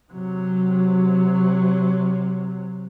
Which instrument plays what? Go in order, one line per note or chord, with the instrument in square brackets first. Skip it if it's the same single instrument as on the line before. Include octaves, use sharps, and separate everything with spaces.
[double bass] C3 F#3